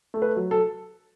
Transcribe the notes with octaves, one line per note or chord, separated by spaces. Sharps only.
A3
B4
F#3
A4